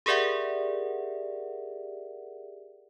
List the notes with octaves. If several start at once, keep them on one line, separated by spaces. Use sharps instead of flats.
G4 G#4 A#4 D5 E5 F#5